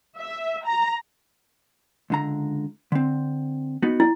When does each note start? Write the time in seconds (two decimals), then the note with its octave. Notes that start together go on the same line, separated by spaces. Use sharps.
0.19 E5
0.66 A#5
2.10 C#2 D3 A#5
2.92 D3 C4
3.83 B3 D#4 F#4
4.00 E4